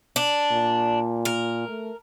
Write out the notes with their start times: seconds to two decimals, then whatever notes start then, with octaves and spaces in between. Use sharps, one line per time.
0.16 D4
0.51 A#2
1.25 A#4
1.68 A3